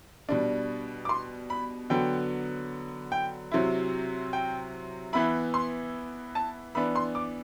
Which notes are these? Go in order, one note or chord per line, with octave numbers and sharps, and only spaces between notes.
B2 G3 D4
D6
C6
B5
D3 F#3 B3 G5
G5
C3 F#3 C4 E4
G5
E3 B3 E4 B5
C6
A5
E3 B3 D4 B5
C6
D6